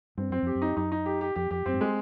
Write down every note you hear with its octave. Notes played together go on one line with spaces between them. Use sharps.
G2 C4
F#2 C4
F2 G4
F#2
D#4
F#2 D#4
D#4
G4
G4
F2 G4
F2 G4
F#2 C4
G#2
G#3